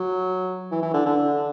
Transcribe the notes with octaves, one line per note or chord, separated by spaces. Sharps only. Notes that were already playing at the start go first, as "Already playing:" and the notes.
Already playing: F#3
E3
E3
D3
D3